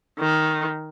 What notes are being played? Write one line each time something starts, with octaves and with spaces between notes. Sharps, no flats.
D#3